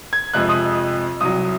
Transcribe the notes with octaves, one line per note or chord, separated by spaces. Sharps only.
G#6
F2 C3 F3 G#3 F#6
D#6
C2 C3 F#3 D#6